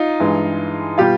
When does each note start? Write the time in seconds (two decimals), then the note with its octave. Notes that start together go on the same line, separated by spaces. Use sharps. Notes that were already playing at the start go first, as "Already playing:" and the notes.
Already playing: D#4 F4
0.20 G2 E3 G#3
0.98 B2 G3 F4 G4